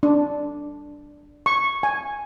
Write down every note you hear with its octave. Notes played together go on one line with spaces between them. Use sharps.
D4
C#6
G#5